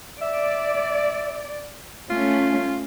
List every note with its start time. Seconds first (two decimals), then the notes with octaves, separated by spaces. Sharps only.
0.22 D5 E5
2.10 A3 C#4 F4